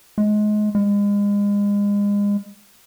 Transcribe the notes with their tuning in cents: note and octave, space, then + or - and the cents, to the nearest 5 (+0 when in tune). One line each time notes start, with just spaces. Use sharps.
G#3 +25
G#3 -35